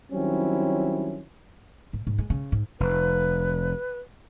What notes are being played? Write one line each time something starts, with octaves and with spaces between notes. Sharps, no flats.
D#3 F#3 G3 C4 C#4 E4
G#2
G#2
G#3
C#3
G#2
F1 B4